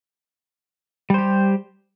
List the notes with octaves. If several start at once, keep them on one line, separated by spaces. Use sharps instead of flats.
G3 G4 C5